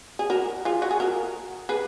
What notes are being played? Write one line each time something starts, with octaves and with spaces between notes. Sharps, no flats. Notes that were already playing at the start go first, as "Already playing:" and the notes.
G#4
F#4 A#4
F4 G#4
F#4
G#4
F#4 A#4
G#4 B4